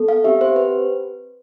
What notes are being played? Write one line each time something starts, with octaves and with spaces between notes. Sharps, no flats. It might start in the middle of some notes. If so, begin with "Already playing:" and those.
Already playing: B3 A4
F5
C4 G4 E5
C5
B4